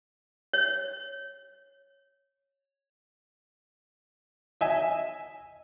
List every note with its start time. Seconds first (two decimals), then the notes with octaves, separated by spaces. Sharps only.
0.53 C#5
4.61 D#5 E5 G#5